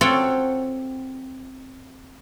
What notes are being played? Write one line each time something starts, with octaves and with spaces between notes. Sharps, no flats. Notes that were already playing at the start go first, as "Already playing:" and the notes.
C4 F4 A4 C#5 F#5 G5